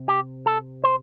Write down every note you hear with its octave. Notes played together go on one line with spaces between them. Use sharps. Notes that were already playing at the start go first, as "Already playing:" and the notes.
Already playing: C3
G4
A4
C5